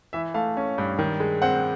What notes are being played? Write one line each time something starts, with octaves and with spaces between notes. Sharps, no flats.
E3 E5
A3 F5
C#4
G2
D#3
G#3
C4 F#5